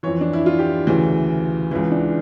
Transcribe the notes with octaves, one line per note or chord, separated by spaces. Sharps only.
F2 E3 C#5
D4
E4
F4
G4
D2 C#3 E3
C#2 C#3 E3 E4
D4